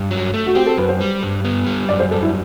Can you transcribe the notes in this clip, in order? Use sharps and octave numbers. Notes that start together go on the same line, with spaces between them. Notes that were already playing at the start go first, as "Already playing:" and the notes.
Already playing: G2
F#3
A3
F#4
C4 G4
A4
F#2 B4
C5
G3
G2
B3
G3
F#2 D5
C5
G3 A4
E4